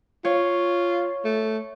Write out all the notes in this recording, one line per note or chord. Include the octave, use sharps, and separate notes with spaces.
F4 C#5
A3